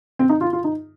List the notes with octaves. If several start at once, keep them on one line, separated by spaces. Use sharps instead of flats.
C4
D#4
F4
F4
D#4